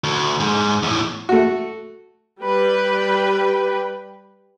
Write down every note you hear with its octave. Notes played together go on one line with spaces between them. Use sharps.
D2
G#2
E2 A2
A3 F#4
G3 B4 G5